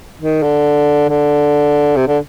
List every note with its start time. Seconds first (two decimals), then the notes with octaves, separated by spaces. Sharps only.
0.21 D#3
0.43 D3
1.09 D3
1.96 C3
2.07 D3